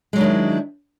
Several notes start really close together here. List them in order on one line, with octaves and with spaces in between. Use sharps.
G#3 F#3 D4 D#3 E4